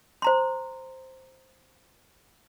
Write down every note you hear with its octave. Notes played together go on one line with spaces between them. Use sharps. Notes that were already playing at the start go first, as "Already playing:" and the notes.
C5 A#5 C6